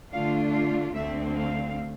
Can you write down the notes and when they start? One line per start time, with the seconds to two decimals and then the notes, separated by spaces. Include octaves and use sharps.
0.12 D3 A3 D4 F4 F5
0.53 F5
0.94 D2 D3 A3 C4 E5
1.35 F5